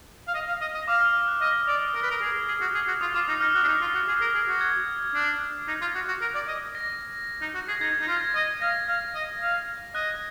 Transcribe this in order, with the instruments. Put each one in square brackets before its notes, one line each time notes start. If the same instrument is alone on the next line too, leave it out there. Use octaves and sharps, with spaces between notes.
[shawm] F5
D#5
F5
D#5
D#5
[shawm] F5 [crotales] D6
[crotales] F6
F#6
[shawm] D#5 [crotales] F6
[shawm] D5 [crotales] D#6
[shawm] A#4 [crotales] F6
[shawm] B4
A#4
G#4
G#4
F#4
G#4
F#4
[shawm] F4 [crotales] D#6
[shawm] F4 [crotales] D6
[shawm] D#4 [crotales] D#6
[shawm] D#4 [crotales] F6
[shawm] F#4 [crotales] F#6
[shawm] D4
D#4
F4
F#4
G#4
A#4
G#4
F#4
[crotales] G#6
[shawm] D4
D#4
F4
F#4
F#4
A#4
D5
D#5
[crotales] A#6
[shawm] D#4
F#4
G#4
[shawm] D#4 [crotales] G#6
[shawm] D#4
[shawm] F4 [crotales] A#6
[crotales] G#6
A#6
[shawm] D#5 [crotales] G#6
[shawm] F5 [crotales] A#6
[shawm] F5 [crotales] A#6
[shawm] D#5
F5
[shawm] D#5 [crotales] F#6